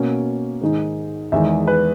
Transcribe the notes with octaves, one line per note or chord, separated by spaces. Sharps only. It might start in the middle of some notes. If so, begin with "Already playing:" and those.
Already playing: B2 A#3 C#4
G#2 D#3 G#3 D#4
E2 D#3 G#3 E5
B4